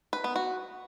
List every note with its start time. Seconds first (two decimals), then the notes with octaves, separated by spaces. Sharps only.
0.13 B4
0.24 B3
0.36 F#4